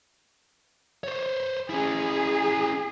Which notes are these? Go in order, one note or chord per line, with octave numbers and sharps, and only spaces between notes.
C5 C#5
C#4 E4 G#4